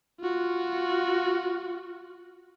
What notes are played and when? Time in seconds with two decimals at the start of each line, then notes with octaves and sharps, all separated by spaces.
0.20 F4 F#4